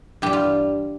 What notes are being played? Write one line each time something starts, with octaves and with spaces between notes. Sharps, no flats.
G2 E3 G3 G4
F4